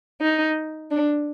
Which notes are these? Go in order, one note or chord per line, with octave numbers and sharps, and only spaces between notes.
D#4
D4